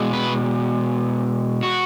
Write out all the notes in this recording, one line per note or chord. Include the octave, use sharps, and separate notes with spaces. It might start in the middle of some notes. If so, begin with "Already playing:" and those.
Already playing: B2 G#3
B4
F#4